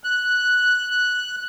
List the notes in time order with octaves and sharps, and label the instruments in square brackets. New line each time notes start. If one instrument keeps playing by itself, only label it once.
[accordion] F#6